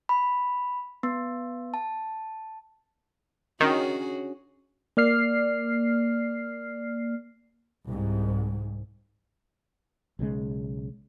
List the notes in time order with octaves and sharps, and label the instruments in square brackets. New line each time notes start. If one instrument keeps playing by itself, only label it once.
[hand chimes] B5
B3
A5
[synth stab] D#3 [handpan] C#4 D4 [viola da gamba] F#4 G#4
[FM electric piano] A#3 D5 F6 C7
[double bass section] C2 G#2
[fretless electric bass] B1 C#3 G3 G#3